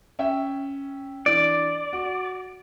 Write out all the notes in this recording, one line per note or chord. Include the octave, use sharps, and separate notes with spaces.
C#4 E5 G5
E3 D4 D5
F#4